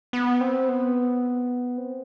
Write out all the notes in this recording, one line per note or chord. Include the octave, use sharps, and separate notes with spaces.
B3
C4
B3
C4